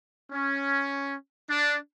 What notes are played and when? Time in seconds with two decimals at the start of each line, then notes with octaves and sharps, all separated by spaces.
0.31 C#4
1.50 D4